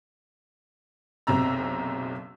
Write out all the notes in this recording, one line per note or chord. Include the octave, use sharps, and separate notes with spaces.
F#1 B1 C3 C4 A#5 E6